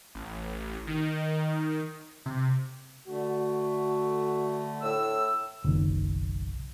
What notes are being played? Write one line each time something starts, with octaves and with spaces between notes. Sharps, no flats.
A1
D#3
C3
D3 A3 F#4
A2 E6
F#1 B1 D#3